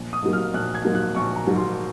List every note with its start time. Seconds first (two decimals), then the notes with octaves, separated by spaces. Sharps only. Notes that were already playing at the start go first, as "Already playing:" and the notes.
Already playing: A#1
0.13 D#6
0.23 G#2 F#3 A#3
0.33 F6
0.54 A#1 F#6
0.75 G#6
0.85 G#2 F#3 A#3
0.95 F#6
1.15 A#1 C#6
1.36 A#5
1.47 G#2 F#3 A#3
1.56 C6